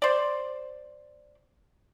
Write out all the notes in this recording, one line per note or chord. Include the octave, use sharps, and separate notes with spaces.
C5 D5